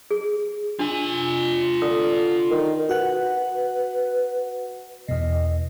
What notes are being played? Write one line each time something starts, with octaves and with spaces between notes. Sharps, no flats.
G#4
D4 F4 G#5
D3 D#6
D#3
F#4 B4 F#5
E2 B2 D#5